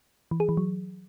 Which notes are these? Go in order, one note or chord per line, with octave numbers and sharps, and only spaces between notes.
E3
G#4
E3
F#3